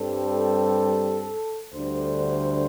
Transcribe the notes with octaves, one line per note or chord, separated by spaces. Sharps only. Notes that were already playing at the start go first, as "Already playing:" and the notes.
Already playing: G2 G3 C4 A4
D2 D3 G3 C5